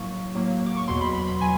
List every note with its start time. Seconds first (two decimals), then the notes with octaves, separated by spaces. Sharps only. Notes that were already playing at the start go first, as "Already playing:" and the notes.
Already playing: A2 F#3 A#3 C#6
0.35 A2 F#3 A#3
0.66 D6
0.77 C#6
0.87 E2 B2 F#3 C6
1.01 B5
1.15 B5
1.28 B5
1.41 B2 F#3 G#5